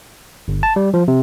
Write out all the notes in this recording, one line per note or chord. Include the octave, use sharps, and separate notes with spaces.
G1
A5
G3
F3
C3